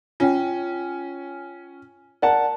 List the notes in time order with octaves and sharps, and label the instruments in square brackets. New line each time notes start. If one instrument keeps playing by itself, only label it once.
[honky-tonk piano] C#4 [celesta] F4 G5
[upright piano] A#4 F#5 A5 [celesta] D5